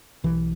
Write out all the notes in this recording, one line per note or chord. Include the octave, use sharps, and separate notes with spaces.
B1 E3